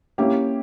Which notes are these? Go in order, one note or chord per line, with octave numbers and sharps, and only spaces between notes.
A#3 C#4 E4 G4